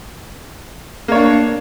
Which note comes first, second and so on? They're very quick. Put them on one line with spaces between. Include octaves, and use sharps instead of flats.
A#3 C#5 D4